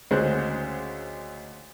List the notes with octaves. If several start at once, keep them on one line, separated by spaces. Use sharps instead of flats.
D2 C#3 G#3 C#4 C5 F#6